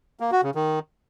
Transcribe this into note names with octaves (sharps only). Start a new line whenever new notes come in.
A#3
F#4
C#3
D#3